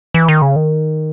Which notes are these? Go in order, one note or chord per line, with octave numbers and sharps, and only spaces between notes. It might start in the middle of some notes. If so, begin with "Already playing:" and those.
E3
D#3
C#3
D#3